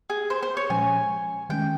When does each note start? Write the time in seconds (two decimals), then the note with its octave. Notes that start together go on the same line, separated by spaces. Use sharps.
0.10 G#4
0.30 C5
0.42 C5
0.57 C#5
0.69 A#2 F3 G#3 C#4 G#5
1.49 D#3 G#3 C#4 G5